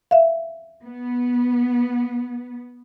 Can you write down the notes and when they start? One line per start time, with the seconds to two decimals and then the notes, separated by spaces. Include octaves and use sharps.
0.11 E5 F5
0.84 B3